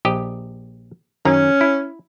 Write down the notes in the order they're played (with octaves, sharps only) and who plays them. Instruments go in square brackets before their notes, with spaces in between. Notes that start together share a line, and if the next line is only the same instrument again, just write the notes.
[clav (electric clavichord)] A#1 G4 D#5
[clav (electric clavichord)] F#2 D#3 A#5 [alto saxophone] C#4
[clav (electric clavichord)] E4